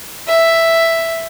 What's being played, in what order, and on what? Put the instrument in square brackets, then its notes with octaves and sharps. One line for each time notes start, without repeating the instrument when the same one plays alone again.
[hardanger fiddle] E5